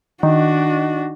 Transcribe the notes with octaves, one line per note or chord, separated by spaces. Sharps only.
D#3 D4 F#4